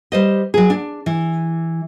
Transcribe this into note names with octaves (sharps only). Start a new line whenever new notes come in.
G3 C5 D#5
F#3 G#4
D4
E3